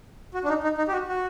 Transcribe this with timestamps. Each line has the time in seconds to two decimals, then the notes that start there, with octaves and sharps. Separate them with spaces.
0.34 F#4
0.44 D4
0.48 D#4
0.63 D#4
0.78 D#4
0.88 G4
0.93 F#4
1.08 F#4